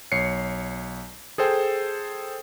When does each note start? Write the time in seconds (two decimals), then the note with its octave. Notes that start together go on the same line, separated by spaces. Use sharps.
0.12 B1 C#5 C7 C#7
1.38 G#4 A4 C5 G5